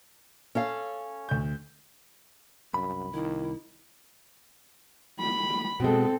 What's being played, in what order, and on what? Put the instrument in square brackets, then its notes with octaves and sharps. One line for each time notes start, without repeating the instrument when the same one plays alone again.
[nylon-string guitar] C#4 A4 F5
[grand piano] D2 G6
[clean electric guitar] C2 B5 [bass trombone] F#2
[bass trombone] D#3 [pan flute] E4
[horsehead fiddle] B5
[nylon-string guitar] B2 G#3 [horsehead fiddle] C4 A4